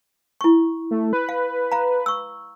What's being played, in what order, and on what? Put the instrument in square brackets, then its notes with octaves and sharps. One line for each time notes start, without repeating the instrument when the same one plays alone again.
[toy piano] E4 C#6
[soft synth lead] A3
B4
[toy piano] F5
F5 A#5
C#6 E6